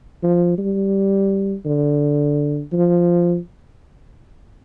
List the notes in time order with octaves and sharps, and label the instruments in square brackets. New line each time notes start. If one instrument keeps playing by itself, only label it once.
[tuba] F3
G3
D3
F3